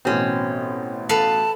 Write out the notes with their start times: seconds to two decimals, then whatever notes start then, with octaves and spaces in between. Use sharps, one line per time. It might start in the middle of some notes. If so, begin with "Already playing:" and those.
0.05 A1 B2 C4 C#4
1.09 A4 B4 F5 A5